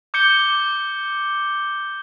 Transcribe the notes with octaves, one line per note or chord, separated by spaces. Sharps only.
D6 G6 C#7 G7